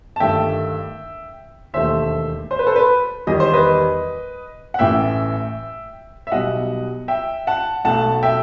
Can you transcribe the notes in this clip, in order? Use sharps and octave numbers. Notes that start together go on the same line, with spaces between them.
A5
G1 G2 D#3 A3 E5 G5
E1 D#2 D#3 A3 C5 E5
C5
B4
A4 C5
B4
E2 D#3 G3 D#5
C5
B4 D#5
F#5
A1 A2 E3 E5 G5
E5
B1 B2 G3 D#5 F#5
E5 G5
F#5 A5
B1 B2 F#3 A3 F#5 A5
E5 G5